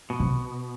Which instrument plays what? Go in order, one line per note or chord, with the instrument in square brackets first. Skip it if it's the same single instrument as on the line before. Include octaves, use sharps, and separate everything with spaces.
[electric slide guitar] B2
[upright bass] C3